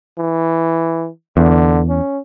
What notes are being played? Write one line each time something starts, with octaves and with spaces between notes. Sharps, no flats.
E3
E2 D3
C#4